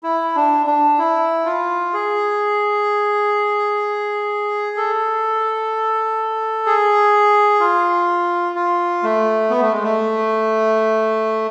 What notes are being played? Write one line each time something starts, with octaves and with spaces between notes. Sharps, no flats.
E4
D4
D4
E4
F4
G#4
A4
G#4
F4
F4
A3
B3
A3
G#3
A3